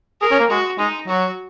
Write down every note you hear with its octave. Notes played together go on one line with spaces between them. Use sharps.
G#4 A#4
C#4
A#3
G#3 F#4
G#3 D#4
F#3 F#4